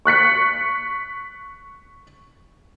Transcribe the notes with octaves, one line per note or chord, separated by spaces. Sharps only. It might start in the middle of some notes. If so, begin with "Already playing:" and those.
C#6 F#6 B6 C#7